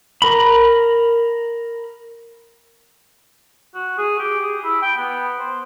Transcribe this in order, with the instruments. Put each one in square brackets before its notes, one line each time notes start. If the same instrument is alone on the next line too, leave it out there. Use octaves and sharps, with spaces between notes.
[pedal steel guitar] A#4 B5
[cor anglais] F#4
G#4
G4
G#4
E4
G5
B3
C5